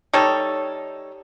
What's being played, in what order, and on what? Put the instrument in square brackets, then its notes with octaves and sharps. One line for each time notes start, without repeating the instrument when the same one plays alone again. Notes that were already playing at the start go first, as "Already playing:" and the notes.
[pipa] G3 D#4 A4 C#5